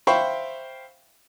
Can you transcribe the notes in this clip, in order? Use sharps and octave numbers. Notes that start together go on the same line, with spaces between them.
C5 E5 F5 G5 B5 C#6